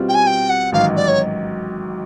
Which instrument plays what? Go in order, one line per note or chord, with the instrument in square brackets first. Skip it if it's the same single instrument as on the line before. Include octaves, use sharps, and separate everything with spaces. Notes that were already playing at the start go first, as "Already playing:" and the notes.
Already playing: [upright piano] B2 G3 C4 F4
[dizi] G5
G#5
G5
F#5
[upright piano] A1 G#2 D#3 F#3 [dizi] F5
[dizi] D5
C#5